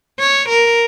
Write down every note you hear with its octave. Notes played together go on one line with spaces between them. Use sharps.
C#5
A#4